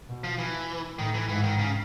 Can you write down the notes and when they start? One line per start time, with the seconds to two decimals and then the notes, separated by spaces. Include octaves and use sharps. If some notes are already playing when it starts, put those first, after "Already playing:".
0.09 B2
0.24 F3
0.39 E3
0.99 A2 D#3
1.14 E3
1.29 G#2 E3
1.44 D#3
1.59 C#3